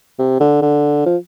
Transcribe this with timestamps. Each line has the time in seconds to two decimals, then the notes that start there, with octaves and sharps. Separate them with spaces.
0.19 C3
0.40 D3
0.62 D3
1.06 F3